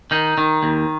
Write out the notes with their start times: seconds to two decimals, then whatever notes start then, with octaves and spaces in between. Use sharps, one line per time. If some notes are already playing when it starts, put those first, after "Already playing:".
0.11 D#3 D#4
0.38 D#3
0.63 D#2